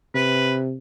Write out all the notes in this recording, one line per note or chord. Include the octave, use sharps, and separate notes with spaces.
C3 B4